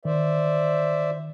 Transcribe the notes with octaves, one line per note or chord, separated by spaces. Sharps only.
D#3 C5 D5 E5